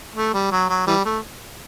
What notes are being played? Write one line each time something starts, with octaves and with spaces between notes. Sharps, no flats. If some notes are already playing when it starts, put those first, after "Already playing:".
A3
G3
F#3
F#3
E3 G3
A3